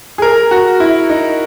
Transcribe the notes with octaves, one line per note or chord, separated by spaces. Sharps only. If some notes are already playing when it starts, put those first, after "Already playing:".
G#4
A#4
F#4
E4
D#4